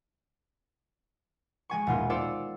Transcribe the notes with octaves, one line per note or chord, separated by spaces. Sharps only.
G#3 G#5 C#6
D#1 B2 F4
F4 C5 D5 E6 C#7